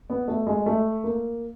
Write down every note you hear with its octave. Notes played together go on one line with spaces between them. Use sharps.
B3
A3
G#3
A3
A#3